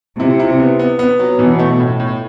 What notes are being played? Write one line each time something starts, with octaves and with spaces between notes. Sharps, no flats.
C3 E4
E4
B3
B3
B3
F#3
B2 E3
A3
A2
A2